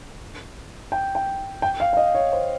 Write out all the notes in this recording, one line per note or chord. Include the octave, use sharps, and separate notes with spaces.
G5
G5
G5
F5
F5
D#5
C#5
C5